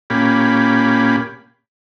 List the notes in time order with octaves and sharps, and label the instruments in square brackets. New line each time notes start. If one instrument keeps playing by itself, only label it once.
[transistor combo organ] A#2 A#3 C#4 G4 B5